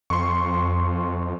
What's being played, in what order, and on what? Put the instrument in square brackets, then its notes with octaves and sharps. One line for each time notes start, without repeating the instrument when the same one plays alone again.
[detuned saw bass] F2 [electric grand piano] C6 C#6